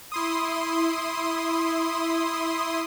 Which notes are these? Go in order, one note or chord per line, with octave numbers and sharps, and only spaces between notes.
E4 C6 D#6